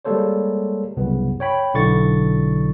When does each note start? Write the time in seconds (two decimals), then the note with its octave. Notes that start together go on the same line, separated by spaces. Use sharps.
0.05 G3 G#3 A#3 A4 C5 C#5
0.97 C2 F#2 C#3 B3
1.40 C#5 G5 B5
1.74 B1 D3 E4 C#6 A6